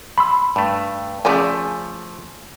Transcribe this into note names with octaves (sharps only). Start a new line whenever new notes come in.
B5 C6 E6
G2 A3
C#3 F3 A3 D5 G#5